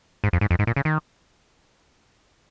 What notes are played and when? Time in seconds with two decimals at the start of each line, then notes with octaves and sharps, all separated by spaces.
0.24 G#2
0.33 F2
0.41 G#2
0.51 F2
0.59 G#2
0.67 A#2
0.76 C#3
0.85 D#3